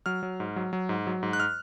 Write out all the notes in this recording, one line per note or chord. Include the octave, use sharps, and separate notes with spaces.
F#3 F6
F#3
G#2
F#3
F#3
G#2
F#3
G#2
F#6
F6